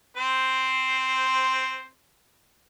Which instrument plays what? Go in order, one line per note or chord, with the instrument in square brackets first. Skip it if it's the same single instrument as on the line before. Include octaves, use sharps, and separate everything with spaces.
[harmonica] C4 C5